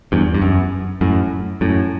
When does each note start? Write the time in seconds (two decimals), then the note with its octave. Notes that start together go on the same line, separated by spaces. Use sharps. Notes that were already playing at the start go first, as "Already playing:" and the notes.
0.12 E2 G2
0.34 G2
0.42 F#2
1.01 F#2 A2
1.61 F#2 A2